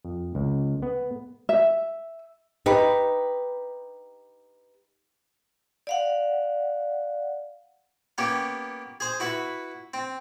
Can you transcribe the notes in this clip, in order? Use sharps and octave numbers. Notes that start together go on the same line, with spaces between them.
F2
C#2
B3
E5
D#4 G4 B4
D5 F5 F#5
A#3 B3 C#4 G4
G#4 C5
E4 F#4 B4
C4